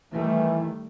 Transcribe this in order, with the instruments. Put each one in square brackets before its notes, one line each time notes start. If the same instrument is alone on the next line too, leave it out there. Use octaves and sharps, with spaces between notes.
[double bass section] D#3 G3 A3 [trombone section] E3